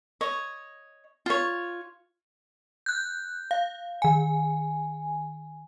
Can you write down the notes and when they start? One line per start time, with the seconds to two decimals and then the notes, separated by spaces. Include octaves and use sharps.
0.21 C#5 D#5
1.26 F4 C#5
2.86 F#6 G6
3.51 F5
4.02 D#3 G#5